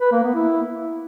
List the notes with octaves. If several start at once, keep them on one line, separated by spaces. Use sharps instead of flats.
B4
A#3
B3
E4